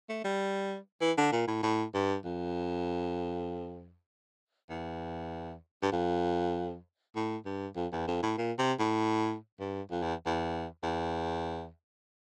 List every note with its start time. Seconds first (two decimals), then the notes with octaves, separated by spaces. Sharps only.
0.09 A3
0.24 G3
1.01 E3
1.17 D3
1.32 A#2
1.48 A2
1.63 A2
1.94 G2
2.25 F2
4.70 E2
5.82 G2
5.92 F2
7.15 A2
7.46 G2
7.76 F2
7.92 E2
8.07 F2
8.23 A2
8.38 A#2
8.58 C3
8.79 A2
9.60 G2
9.91 F2
10.02 E2
10.26 E2
10.83 E2